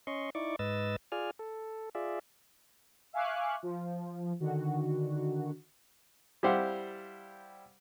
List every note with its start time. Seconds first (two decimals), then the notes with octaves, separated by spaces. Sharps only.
0.07 C#4 D#5 C6 C#6
0.35 D#4 E4 D5 C#6 D6
0.59 G#2 B4 D#5 E6 A6
1.12 F4 G#4 D5 G#5 F6
1.39 A4
1.95 F4 G#4 D5 E5
3.13 E5 F5 G#5 C#6 D6 F#6
3.63 F3
4.40 D3 D#3 F#4
6.43 G3 E4 G4 C5 F5 F#5